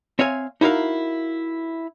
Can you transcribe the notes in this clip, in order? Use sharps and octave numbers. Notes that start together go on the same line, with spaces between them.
C4 C#5 E5 F5 G#5
D#4 E4 F#4 A#4 F5